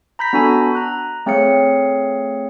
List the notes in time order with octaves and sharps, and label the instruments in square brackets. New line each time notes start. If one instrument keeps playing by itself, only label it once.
[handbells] A#5 B5 G6 A#6 B6
B3 D4 F#4 A4 G#5 B5
A#5 F#6
A3 C4 G#4 C#5 F5 C#7